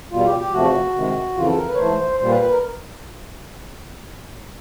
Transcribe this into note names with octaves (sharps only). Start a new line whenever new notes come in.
E2 B2 G3 F4
G4
G4
E2 C3 F3 A3 F#4
C3 D#3 G#3
F2 C#3 E3 F4
A4
A#4
B4
C#5
G#2 E3 A3 C5
A#2 G3 A#3 C5
B4
B4
A#4